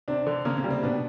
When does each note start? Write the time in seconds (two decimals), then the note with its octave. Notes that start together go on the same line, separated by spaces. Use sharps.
0.08 C3 C4 D4
0.27 D3
0.45 C#3 A#3 C#4
0.58 C#3 C#4
0.64 G3
0.70 C3 C4
0.83 B2 B3 D4